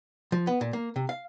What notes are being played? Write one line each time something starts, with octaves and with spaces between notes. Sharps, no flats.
F3
B3
A#2
A#3
C3
F5